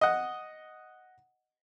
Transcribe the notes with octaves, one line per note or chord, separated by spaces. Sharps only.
D#5 F#5